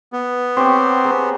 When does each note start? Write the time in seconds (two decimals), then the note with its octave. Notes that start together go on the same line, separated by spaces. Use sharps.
0.13 B3
0.57 C4 G4 C#5 A#5
1.04 G#4 A#5 B5